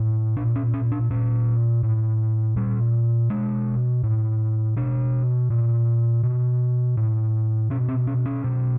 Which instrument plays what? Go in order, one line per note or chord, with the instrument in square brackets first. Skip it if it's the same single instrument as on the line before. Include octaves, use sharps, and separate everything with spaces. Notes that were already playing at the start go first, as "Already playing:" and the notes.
Already playing: [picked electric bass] A2
A#2 D4
C#4
C#4
D4
A#2 C#4
A2
A#2 G3
B2 G#3
A2
B2 D4
A#2
B2
A2
B2 C#4
C4
C#4
C#4
B2